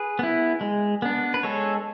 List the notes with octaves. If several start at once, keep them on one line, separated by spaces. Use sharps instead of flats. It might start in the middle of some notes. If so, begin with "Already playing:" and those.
Already playing: G#4 B4
B3 E4
G#3
B3 D4
B4
G#3 A4 C#5